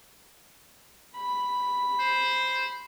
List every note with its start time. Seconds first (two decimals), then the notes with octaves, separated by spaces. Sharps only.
1.16 B5
1.99 C5